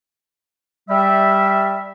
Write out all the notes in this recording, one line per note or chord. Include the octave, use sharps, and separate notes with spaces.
G3 E5